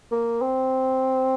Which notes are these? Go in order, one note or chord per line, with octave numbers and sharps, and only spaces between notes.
A#3
C4